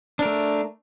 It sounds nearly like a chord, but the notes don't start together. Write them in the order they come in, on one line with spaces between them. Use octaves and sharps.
D4 A#4 A3